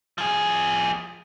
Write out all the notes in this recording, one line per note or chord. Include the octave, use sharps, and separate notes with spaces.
F3 G#4